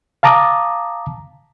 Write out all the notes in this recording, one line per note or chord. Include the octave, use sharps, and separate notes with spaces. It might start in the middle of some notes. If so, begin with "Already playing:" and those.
F5 A5 A#5 D6 D#6